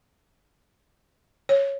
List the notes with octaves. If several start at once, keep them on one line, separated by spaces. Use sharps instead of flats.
C#5